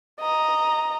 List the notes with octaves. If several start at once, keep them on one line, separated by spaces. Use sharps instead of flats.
D#5 A#5